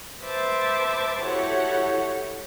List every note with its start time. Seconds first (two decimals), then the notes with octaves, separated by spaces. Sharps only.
0.22 B4 C5 E5 A5 D6
1.21 E4 F#4 G4 A4 C#5 F#5